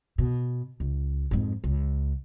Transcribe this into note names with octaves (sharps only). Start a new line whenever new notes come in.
B2
C#2
F2 G#2
C#2